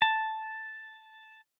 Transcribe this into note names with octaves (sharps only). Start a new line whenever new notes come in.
A5